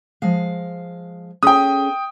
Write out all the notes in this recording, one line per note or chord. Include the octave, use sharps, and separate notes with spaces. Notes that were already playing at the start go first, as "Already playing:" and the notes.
F3 G#3 F5
C#4 G#4 A4 G5 D#6